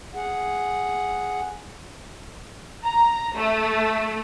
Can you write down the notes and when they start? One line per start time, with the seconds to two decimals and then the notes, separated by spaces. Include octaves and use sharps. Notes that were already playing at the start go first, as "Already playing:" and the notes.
0.14 G#4 F#5
2.84 A#5
3.35 A3